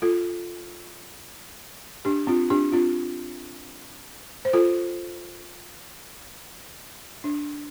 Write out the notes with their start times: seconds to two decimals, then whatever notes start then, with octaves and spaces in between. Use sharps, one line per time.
0.02 F4 A4
2.05 D4 G4
2.27 C4 F4
2.50 D4 G4
2.72 C4 F4
4.45 C5
4.53 F4 A4
7.24 D4